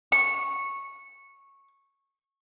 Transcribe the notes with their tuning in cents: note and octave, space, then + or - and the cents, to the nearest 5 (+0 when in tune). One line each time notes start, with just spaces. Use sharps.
C#6 -10